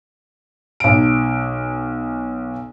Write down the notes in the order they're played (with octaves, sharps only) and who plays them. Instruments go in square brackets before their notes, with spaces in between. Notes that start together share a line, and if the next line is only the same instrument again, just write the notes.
[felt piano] B1 D7